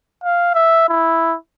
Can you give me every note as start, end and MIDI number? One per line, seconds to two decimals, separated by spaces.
0.24 0.54 77
0.55 0.87 76
0.88 1.36 64